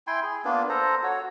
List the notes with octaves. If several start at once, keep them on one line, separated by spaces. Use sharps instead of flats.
E4 G5 G#5 C6
G#4
A#3 B3 D4 F4
A4 C5 A#5
F#4 C#5